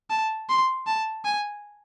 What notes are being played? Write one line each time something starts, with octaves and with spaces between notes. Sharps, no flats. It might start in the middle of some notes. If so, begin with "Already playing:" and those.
A5
C6
A5
G#5